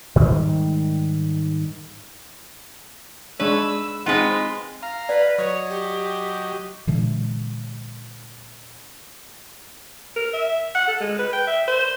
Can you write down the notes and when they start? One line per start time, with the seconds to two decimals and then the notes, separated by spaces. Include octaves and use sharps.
0.16 G#2 D#3 G3 G#3
3.40 G#3 D4 B4 C#5 E6
4.06 G#3 C4 D#4 F4 B4 F#5
4.82 F5 A#5
5.09 B4 D5
5.38 F#3 C#5 D#5
5.70 G4
6.87 A#2 D3 E3 G#3
10.16 A#4
10.33 E5
10.75 F#5
10.88 A4
11.01 G#3
11.19 B4
11.33 G5
11.47 E5
11.68 C5